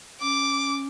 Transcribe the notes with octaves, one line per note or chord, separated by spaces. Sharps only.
C#4 D6